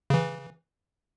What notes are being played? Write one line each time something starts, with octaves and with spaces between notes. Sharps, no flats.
C#3 E3